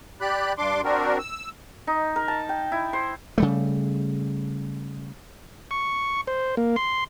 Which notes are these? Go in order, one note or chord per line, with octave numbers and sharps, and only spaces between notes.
G4 D5 B5 F#6
G2 D4 C6 D6
C4 D4 F#4 A#4
E6
D#4
A#4
A5
G5
E4
C5
C#3 G3 A3
C#6
C5
A#3
C6